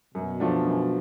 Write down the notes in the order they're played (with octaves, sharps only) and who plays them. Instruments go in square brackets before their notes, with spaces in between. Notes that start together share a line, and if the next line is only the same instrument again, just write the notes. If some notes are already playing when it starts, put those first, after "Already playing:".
[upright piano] F#2 [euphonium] B2
[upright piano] F3 A3 D4
F#2